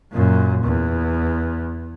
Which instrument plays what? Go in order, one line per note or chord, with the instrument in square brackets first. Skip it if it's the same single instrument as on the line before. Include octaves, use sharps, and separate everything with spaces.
[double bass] F#2 A#2
E2